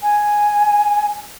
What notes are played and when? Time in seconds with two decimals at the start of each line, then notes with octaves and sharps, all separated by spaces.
0.03 G#5